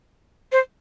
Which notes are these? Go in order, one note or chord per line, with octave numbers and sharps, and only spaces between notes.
C5